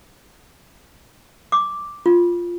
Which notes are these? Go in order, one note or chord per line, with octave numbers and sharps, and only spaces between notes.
D6
F4